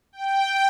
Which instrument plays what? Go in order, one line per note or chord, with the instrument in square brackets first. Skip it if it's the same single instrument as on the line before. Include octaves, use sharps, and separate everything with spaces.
[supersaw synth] G5